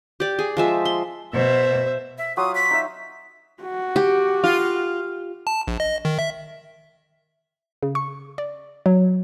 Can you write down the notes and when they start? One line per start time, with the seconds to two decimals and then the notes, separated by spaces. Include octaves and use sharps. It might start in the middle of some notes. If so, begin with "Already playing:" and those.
0.20 G4 D5
0.39 G#4
0.57 F3 G#3 E5
0.85 C6
1.33 B2 C5 E5
2.18 E5
2.37 F#3 F4 F5 D#6
2.55 B6
2.71 D#4 E5
3.62 F#4
3.96 G4
4.44 F4
5.47 A5
5.68 A#1
5.80 D#5
6.05 D#3
6.19 E5
7.83 C#3
7.95 C#6
8.38 D5
8.86 F#3